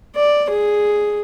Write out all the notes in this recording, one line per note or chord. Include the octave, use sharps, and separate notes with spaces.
D5
G#4